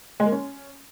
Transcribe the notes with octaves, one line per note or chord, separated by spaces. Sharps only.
G#3
A#3
C#4